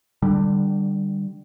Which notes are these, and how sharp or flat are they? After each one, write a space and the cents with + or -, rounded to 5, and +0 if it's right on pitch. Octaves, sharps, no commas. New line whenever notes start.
D3 +20 G3 -5